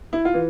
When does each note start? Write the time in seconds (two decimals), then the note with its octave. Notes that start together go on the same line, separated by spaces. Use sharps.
0.13 E4
0.25 F4
0.34 E3